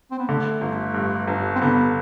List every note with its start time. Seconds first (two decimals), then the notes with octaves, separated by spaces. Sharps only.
0.11 C4
0.19 B3
0.28 D3 A3
0.61 G1
0.94 G2
1.27 G1
1.56 C4
1.61 D3 B3